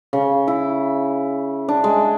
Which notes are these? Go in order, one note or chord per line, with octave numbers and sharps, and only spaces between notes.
C#3
E4
D4
G#3